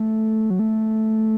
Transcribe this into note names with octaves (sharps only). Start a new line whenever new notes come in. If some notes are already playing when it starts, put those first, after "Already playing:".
Already playing: A3
F#3
A3